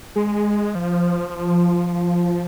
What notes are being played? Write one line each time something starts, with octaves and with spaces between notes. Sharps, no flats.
G#3
F3